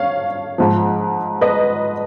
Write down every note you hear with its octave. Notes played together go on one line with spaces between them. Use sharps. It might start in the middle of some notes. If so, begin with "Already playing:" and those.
Already playing: C#5 F5
G#2 F3
B4 D#5